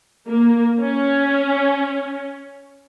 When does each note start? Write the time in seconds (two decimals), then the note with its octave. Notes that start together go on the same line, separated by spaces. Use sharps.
0.27 A#3
0.81 C#4